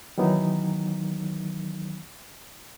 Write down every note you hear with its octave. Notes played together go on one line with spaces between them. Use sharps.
D#3 E3 F#3 B3 D#4